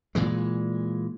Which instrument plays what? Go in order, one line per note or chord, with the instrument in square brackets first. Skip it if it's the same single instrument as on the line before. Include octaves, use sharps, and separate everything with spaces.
[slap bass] A#2 E3 G#3